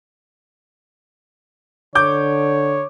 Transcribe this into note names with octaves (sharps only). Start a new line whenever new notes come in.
D3 C#5 D6 G6